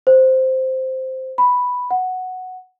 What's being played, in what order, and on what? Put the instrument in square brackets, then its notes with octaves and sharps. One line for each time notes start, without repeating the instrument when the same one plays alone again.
[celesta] C5
B5
F#5